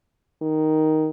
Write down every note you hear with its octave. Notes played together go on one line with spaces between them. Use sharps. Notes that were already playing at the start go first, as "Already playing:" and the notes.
D#3